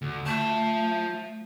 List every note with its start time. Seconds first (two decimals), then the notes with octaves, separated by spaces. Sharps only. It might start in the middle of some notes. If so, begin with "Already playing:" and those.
0.02 D2
0.26 A3 F4 A5